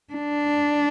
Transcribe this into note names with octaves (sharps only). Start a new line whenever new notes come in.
D4